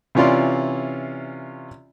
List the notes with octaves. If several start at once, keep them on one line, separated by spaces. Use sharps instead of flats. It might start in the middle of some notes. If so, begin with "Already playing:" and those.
C3 E3 C#4 F4 D5 C6